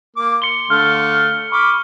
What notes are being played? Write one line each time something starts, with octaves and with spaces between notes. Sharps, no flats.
A#3 D6
C6 C#7 G7
D3 A3 F5 F6
B5 C#6 D6 F6